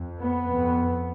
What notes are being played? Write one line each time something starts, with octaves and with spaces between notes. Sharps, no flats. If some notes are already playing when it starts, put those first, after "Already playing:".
Already playing: F2
B3
F2